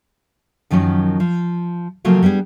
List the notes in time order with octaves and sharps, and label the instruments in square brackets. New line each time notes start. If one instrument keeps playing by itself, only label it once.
[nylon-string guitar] F#2 D#3 F3 F#3 C#4
F3
C#3 F3 F#3 A3 A#3
G3 B3 D4 G#4